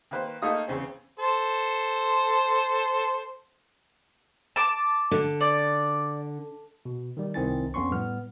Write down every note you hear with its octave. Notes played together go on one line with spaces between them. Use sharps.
D#3 A#3 B4 C5
A3 A#3 D#4 F4 D#6
E2 C#3 C4 G#4
A4 C5
A5 D6
D3
D5
B2
D#3 G3
C2 D#3 C4 E4 G#5 A6
F2 B3 C#4 C6 C#6
A2 G3 B3 F6